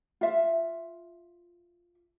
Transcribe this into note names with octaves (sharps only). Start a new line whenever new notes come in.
F4 E5